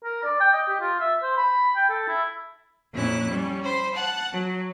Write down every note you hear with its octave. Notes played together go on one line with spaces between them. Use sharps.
A#4
D5
G5
D#5
G4
F4
E5
C5
B5
G5
A4
E4
F2 A#2 C#4 E4 F#6
G3 C#4
C5 B5 C6
F#5 A5 F#6
F#3